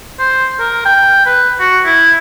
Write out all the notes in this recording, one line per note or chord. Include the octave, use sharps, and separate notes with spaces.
C5
A#4
G5
B4
F#4
E4